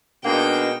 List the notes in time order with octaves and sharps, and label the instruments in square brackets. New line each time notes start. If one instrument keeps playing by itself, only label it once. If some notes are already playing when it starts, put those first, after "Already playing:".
[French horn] B2 [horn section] G#3 A#3 D#4 [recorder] D4 [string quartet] G5